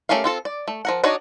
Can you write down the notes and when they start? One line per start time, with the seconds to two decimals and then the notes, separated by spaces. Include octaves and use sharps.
0.09 A3 C#4 G4 A#4 F5
0.24 C4 F4 A4
0.45 D5
0.68 A3
0.85 F3 A#4 F#5
1.04 D4 D#4 F#4 C#5 D#5